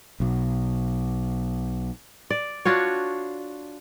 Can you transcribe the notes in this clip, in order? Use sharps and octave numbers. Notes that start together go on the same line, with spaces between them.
B1 B2
D5
D4 F4 F#4 C#5